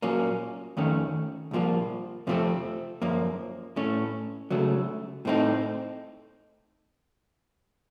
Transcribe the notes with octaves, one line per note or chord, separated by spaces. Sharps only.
A#2 F#3 A#3 C#4
F2 D#3 A3 C#4
C2 A#2 F3 A#3
F2 C3 F3 A3 C4
F#2 F3 A#3
A2 A3 C#4
C#2 C#3 F#3 A3
A2 A3 C4 D#4